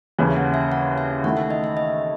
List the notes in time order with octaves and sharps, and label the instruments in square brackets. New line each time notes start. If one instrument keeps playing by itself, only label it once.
[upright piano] D#2 C#3 E3
[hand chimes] E5
F#5
E5
F#5
E5
[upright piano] D#3 A3 E4 [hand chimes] F#5
[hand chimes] E5
D#5
E5
D#5